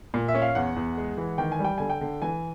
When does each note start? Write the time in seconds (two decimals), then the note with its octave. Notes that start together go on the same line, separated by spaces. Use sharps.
0.14 A#2
0.28 E5
0.35 C#4
0.42 F5
0.55 E2 F#5
0.76 E2
0.97 G#3
1.18 E3
1.38 D#3 G5
1.52 G#5
1.59 G3
1.64 G5
1.78 D3 G#5
1.90 G5
2.01 D3
2.22 E3 G#5